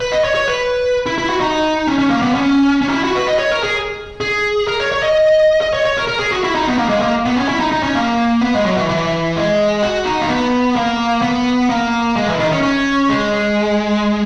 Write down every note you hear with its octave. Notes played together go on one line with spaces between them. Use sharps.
B4
D#5
C#5
C#5
B4
E4
E4
F#4
D#4
C#4
C#4
A#3
B3
C#4
C#4
D#4
E4
F#4
B4
D#5
C#5
A#4
G#4
G#4
A#4
C#5
C#5
D#5
D#5
C#5
C#5
A#4
A#4
G#4
F#4
E4
D#4
B3
A#3
G#3
A#3
B3
C#4
E4
D#4
D#4
C#4
A#3
B3
G#3
F#3
E3
E3
G#3
F#4
D#4
A#3
B3
A#3
B3
A#3
G#3
E3
D#3
C#4
C#4
G#3